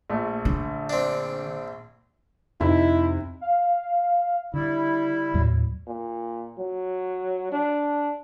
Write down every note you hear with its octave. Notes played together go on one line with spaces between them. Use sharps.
A#1 A3
D3
C4 D4
F2 C3 D#4 E4
F5
D3 G3 E4
D#2 A2 F#3
A#2
F#3
D4